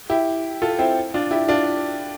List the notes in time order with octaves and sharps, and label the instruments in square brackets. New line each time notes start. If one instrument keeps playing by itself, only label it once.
[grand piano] E4 G4
F4 A4
C4 E4
D4 F4
E4 G4
D4 F4